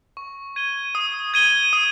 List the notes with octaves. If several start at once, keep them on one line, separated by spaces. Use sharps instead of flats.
C#6
G#6 D#7 G7
D#6
G#6 D#7 G7
D#6